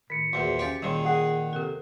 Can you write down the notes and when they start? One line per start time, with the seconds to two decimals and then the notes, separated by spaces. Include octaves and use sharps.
0.10 A2 D#3 B6 C#7
0.33 E2 A#2 F#4 G#4 C5
0.59 C#4 G4 F5 C6
0.82 A#2 D#3 G3 G#4 C#5 C6
1.05 G#4 F#5
1.53 C3 A4 A#4